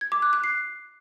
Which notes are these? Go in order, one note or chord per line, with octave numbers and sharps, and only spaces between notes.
G#6
D6
F#6
F#6
C7